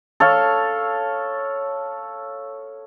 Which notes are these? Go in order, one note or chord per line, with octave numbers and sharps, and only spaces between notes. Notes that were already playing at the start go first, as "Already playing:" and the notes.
A4 C#5 F5